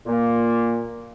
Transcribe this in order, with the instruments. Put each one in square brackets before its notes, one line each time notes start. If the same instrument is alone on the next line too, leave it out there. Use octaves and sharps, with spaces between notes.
[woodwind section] A#2 A#3